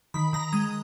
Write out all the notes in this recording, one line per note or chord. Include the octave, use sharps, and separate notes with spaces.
D#3 B5
D#3 A#5
G#3 D#6